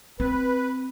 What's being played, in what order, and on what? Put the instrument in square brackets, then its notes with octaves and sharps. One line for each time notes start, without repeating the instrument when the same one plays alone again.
[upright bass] C4 [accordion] B4